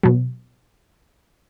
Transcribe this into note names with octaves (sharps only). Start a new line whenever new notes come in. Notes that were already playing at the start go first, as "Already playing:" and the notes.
B2 F#3